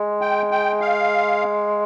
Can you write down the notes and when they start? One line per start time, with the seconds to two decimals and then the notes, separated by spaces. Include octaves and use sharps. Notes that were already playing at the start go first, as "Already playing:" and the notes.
Already playing: G#3
0.21 G5
0.51 G5
0.81 F5